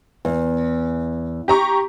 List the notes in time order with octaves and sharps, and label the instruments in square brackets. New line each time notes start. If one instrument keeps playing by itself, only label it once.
[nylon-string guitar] E2
[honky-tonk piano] G4 A#5 C#6